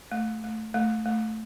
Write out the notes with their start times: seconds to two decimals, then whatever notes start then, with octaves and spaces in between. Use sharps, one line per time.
0.12 A3
0.44 A3
0.74 A3
1.05 A3